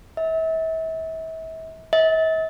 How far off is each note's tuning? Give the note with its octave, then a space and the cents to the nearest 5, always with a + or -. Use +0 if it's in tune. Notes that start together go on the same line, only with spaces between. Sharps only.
E5 -35
E5 -45